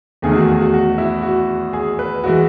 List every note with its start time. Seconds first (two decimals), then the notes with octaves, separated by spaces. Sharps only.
0.22 E2 D#3 A3 G#4
0.35 F#4
0.48 G#4
0.61 F#4
0.74 F#4
0.98 E4
1.23 F#4
1.73 G#4
1.99 B4
2.24 E3 G#3 F#4